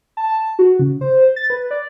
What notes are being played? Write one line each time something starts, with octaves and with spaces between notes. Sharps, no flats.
A5
F#4
C#3
C5
A6
B4
D5